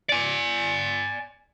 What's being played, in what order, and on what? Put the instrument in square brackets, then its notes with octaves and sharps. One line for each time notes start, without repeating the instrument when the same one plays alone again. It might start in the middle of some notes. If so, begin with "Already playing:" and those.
[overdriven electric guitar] D5 G#5